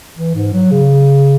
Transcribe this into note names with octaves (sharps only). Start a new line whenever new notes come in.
E3
G#2
F#3
C#3